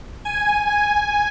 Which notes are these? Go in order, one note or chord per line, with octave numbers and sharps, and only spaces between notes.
G#5
G#5